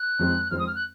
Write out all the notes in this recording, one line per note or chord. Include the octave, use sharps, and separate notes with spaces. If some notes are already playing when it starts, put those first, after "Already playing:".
Already playing: F#6
F2 D#3 G#3 C4
F2 D#3 G#3 C4 F6
D#6
F6
F#6